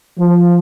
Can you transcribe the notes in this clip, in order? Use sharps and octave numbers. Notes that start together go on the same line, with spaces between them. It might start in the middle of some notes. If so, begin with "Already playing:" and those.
F3